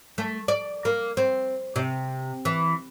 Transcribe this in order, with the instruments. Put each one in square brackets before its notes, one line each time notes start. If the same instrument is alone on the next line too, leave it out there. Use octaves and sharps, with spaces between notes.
[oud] A3
D5
A#3
C4
C3
E3